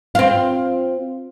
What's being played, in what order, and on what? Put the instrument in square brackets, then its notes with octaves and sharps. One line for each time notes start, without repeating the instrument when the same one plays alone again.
[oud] C4 F4